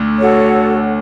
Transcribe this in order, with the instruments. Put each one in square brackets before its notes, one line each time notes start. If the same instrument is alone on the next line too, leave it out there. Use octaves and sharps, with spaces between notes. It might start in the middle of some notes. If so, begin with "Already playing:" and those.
Already playing: [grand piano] D2 D3
[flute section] F#4 A4 C#5